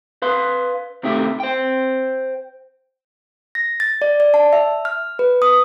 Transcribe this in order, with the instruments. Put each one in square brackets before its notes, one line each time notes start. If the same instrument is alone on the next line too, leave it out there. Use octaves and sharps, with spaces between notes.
[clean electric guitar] B4 F5 C6
C3 D#3 A3 G4 E5
C5 G5
[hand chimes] A#6
A6
D5
D5
A5
E5
F6
B4
D#6